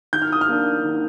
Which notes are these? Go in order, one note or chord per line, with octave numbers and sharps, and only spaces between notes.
D#3 G6
F6
D#6
F6
A#3 D4
D#3